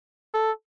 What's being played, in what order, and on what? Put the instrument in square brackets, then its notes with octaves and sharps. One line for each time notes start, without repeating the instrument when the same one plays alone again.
[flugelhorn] A4